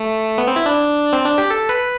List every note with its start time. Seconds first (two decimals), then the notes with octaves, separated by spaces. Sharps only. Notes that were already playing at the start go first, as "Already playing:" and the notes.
Already playing: A3
0.38 B3
0.47 C4
0.56 E4
0.66 D4
1.13 C4
1.26 D4
1.38 G4
1.50 A4
1.69 B4